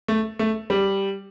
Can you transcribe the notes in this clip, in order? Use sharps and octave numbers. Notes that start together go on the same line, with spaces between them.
A3
A3
G3